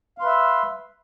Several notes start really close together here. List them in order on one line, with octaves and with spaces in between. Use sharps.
F5 C6 B4 E5 E6